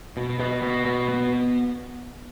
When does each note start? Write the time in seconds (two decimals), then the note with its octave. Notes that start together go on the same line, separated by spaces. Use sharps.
0.17 B2
0.39 B2
0.62 B2
0.85 B2
1.08 B3